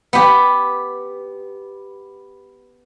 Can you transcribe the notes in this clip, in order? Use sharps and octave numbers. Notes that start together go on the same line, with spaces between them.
B3 G4